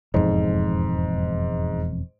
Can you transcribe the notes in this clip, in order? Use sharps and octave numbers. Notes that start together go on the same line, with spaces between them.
E1 F2 G#2